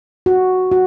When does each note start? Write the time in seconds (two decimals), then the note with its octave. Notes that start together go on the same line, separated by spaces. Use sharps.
0.26 F#4
0.71 F#4